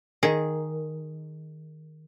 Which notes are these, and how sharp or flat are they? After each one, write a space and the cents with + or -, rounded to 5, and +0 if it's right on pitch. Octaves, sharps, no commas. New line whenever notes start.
D#3 +0 G#4 +0